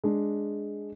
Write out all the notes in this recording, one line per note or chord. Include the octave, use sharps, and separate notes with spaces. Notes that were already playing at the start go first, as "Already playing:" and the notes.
G#3 D4